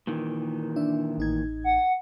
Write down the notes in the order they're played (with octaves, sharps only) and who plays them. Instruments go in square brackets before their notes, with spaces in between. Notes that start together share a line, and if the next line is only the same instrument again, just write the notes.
[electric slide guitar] A#2 D#3 E3
[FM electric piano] D4 E5
A1 D#4 G#6
[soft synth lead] F#5